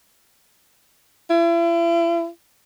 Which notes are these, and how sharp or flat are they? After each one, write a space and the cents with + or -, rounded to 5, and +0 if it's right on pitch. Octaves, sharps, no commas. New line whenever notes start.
E4 +40